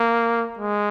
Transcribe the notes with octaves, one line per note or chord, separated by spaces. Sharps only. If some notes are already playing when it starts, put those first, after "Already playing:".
Already playing: A#3
G#3